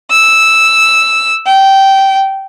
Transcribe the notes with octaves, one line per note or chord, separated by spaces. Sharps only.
E6
G5